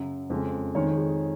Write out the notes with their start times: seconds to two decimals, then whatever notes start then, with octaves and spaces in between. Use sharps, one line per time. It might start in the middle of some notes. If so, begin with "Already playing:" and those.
Already playing: F#2 C#3 F#3
0.30 F2 C#3 G#3
0.75 F2 D#3 G#3 C#5
0.98 G#4